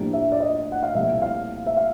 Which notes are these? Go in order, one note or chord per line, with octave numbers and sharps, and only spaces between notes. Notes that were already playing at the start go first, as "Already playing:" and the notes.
Already playing: A2 F3 A#3 D4 G4
E5
D5
D#5
F#5
F5
C2 A#2 F3 A3 E5
F5
E5
F5